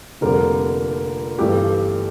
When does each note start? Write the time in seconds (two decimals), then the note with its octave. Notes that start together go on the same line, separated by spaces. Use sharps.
0.21 F1 F2 D3 G3 A#3 A#4
1.39 G1 G2 E3 A3 G4